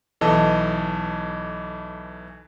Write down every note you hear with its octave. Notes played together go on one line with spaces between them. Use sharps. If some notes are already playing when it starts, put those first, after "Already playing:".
B1 E3 A4 D#5 A5